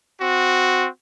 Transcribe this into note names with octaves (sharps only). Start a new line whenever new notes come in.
C4 F#4